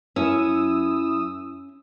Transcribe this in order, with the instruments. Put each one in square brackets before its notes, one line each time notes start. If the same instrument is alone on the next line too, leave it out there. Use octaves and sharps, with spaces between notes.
[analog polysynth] F#2 D#6 E6 [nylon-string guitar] C#4 [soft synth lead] E4